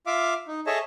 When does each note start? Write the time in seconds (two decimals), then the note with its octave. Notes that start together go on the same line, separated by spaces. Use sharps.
0.07 F4 E5 F5 D6
0.47 D#4
0.67 G#4 A4 C#5 D#5 E5 A5